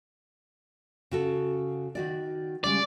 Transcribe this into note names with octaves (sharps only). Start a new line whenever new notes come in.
C#3 F#4 A4
D#3 F#4 D5
C#3 G3 G#3 D5